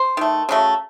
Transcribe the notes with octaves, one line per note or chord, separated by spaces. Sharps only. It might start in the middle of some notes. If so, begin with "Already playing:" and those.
Already playing: C5
D#3 A3
C#3 F#3 A3